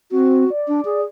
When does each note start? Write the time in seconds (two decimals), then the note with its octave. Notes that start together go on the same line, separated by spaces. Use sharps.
0.11 C4 F#4
0.50 D5
0.68 D4
0.85 G#4